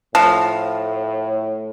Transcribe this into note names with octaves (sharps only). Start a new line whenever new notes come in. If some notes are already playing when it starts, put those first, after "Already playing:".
A2 F3